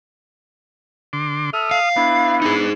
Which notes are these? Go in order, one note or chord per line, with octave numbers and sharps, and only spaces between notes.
D3 C6 D6
A4 E5 D#6 F6
F5
B3 D4 E4
D#4 G#4